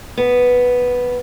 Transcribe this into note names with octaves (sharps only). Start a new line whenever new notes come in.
B3